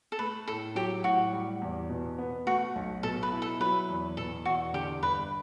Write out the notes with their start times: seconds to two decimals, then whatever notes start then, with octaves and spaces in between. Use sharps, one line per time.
0.12 A4
0.19 A3 B4
0.48 A2 A4
0.76 F#3 G4
1.04 A2 F#4
1.32 G3
1.62 E2
1.90 B2
2.18 B3
2.47 A3 F#4
2.76 B1
3.03 B2 A4
3.23 B4
3.32 E4
3.42 A4
3.60 F#3 B4
3.89 E2
4.17 B2 A4
4.45 E2 F#4
4.73 D3 G4
5.02 G1 B4